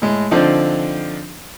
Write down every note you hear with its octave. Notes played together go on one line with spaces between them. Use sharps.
A2 G#3
D3 F3 C4 D4 D#4